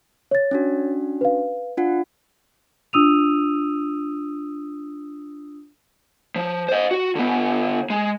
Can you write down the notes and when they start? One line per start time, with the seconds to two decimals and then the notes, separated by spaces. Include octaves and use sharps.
0.31 C#5 A6
0.51 C#4 D4 F#4
1.21 B4 F5
1.77 D4 F4 F#5
2.93 D4 F4 D#6 E6 D#7 F7
6.36 F3
6.68 C5 D#5
6.91 F#4
7.15 D3 B3
7.90 G#3